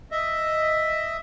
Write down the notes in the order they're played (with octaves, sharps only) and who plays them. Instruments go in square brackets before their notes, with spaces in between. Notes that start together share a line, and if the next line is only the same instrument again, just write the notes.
[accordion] D#5 E5